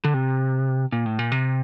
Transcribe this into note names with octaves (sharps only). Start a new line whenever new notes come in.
D3
C3
A#2
A2
A#2
C3